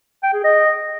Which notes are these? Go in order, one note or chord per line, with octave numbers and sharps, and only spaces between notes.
G5
G#4
D#5